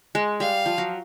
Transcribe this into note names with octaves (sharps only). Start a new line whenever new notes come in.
G#3
G3 F5
F3
F#3